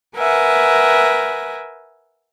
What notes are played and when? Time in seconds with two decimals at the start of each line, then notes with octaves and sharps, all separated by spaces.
0.16 A#4 B4 E5 F#5 G#5